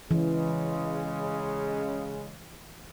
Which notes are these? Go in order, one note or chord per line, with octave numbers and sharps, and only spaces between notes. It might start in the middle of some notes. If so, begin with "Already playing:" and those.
C#3 E3 G#3